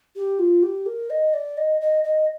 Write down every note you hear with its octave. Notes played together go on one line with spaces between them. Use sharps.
G4
F4
G4
A#4
D#5
D5
D#5
D#5
D#5